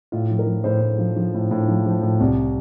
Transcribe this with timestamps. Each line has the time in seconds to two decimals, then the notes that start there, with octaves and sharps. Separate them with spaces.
0.12 A2 F4
0.30 F3
0.39 A#4
0.47 F3
0.64 A2 C5
0.81 A2
0.99 F3
1.16 F3
1.34 A2
1.51 A2
1.68 F3
1.86 F3
2.03 A2
2.20 C2